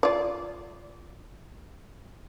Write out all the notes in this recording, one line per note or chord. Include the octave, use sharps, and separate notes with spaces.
F4 D5